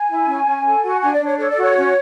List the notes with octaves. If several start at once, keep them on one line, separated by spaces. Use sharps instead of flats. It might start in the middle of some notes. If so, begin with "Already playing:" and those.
Already playing: G#5
E4
C#4
C#4
A4
F#4
D4 G#5
D5
D4
C#5
A4 C#5
D5
F#4
C#5
C#4